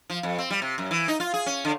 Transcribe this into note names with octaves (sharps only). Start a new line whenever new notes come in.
F3
F2
C4
G3
C3
F#2
E3
D#4
F4
G#4
C#4
D3